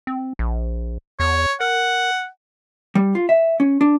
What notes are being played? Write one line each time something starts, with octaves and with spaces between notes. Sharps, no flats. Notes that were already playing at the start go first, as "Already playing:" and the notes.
C4
A#1
E2 C#5
A#4 F#5
G3
F4
E5
C#4
D4